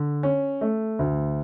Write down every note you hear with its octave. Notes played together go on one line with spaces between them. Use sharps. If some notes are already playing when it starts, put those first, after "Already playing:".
Already playing: D3
C#4
A3
D2